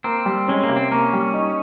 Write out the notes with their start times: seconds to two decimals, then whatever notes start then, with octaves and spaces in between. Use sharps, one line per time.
0.04 A#3 C4
0.26 G3
0.48 G#3 C#4
0.63 A#3
0.69 C3
0.76 C4
0.91 A#3 C#4
1.13 G3
1.34 D#4